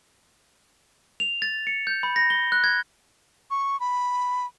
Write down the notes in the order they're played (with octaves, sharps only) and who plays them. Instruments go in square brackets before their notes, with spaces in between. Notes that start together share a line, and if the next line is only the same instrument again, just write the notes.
[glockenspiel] F7
A6
C#7
G6
B5
A#6
G7
F#6
G#6
[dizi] C#6
B5